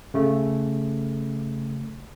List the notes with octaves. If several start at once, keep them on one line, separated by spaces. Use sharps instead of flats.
C#3 A3